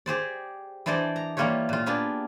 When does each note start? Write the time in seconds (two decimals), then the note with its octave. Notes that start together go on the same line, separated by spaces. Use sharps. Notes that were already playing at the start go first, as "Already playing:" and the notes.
0.06 G4 G#4 C5 D5
0.86 E3 D4 G#4 C5 D5 D#5
1.16 A#5
1.37 E3 G3 A#3 F4 G4 C#5
1.69 A#2 F4
1.86 A#3 B3 D4 G4 G#4